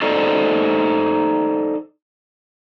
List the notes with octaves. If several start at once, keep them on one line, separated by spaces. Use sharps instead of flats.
D#4 A4 C5 D5 D#5